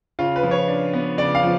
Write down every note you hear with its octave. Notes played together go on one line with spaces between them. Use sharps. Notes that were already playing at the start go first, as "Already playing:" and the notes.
C#3 F4
B4
F3
C#5
D4
B3
C#3 D5
F5
F3